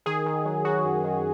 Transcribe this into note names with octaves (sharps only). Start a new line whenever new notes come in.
D#3 G#4
D#3
F#3
F#3 F#4
F#2
D#3